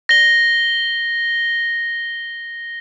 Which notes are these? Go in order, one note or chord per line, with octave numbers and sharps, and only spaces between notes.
A#6 G7